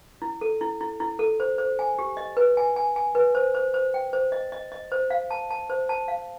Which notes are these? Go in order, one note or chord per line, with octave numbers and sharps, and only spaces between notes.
E4
A4
E4
E4
E4
A4
C5
C5
G#5
G4
D#5
B4
G#5
G#5
G#5
B4
C5
C5
C5
G5
C5
D#5
D#5
D#5
C5
F5
A5
A5
C5
A5
F5